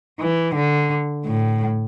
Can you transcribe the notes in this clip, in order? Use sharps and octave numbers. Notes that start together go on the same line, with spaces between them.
E3
D3
A2